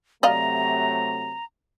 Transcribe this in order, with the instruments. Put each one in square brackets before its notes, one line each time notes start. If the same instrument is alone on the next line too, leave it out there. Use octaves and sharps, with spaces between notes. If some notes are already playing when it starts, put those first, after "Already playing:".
[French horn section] C3 F#3 A3 [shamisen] D5 D#5 F5 [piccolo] A#5